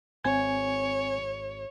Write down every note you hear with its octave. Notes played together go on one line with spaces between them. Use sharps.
G#1 C4 C#5 G#5 G#6